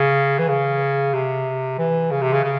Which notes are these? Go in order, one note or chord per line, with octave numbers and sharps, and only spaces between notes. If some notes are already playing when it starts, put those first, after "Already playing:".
Already playing: C#3
E3
C#3
C3
E3
C#3
C3
C#3
C#3